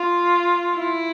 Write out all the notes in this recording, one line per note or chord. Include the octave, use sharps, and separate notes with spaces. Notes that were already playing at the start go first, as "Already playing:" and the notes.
Already playing: F4
E4